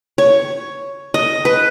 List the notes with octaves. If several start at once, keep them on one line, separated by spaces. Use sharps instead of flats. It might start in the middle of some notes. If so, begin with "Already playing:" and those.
C#5
D#5
B4